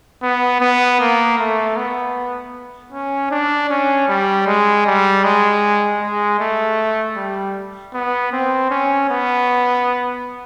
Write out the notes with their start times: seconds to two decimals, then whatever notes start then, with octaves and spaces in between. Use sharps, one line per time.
0.23 B3
0.61 B3
1.00 A#3
1.39 A3
1.77 B3
2.92 C#4
3.31 D4
3.70 C#4
4.08 G3
4.47 G#3
4.86 G3
5.24 G#3
6.02 G#3
6.40 A3
7.17 G3
7.94 B3
8.33 C4
8.71 C#4
9.10 B3